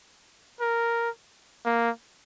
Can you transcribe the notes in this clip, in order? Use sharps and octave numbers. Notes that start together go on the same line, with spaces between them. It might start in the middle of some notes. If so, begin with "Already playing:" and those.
A#4
A#3